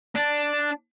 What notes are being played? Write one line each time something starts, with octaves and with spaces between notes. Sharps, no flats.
D4